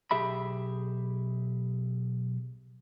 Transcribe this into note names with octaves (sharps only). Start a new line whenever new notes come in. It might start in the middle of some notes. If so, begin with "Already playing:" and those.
B1 G4 G#4 E5 B5